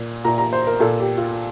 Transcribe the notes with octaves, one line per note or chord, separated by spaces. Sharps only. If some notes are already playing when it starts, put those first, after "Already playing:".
Already playing: A#2
A#2 A#5
A#5
C5
A#4
A#2 A4
G4
F4